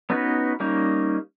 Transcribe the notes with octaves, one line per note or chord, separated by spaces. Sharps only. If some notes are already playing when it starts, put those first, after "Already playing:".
B3 C#4 D#4 F#4 B4
G3 A#3 C#4 D#4